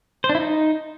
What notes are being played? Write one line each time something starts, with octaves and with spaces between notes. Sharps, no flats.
C5
D4
E4
D#4